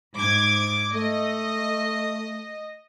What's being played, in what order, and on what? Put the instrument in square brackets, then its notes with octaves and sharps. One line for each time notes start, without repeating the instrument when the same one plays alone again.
[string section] G#2 D6 G#6
[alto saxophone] A3 [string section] D#5